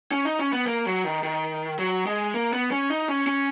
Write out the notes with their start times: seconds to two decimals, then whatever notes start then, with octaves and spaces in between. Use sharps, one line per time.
0.11 C#4
0.25 D#4
0.39 C#4
0.53 B3
0.67 A#3
0.86 F#3
1.04 D#3
1.23 D#3
1.79 F#3
2.06 G#3
2.34 A#3
2.53 B3
2.72 C#4
2.90 D#4
3.08 C#4
3.27 C#4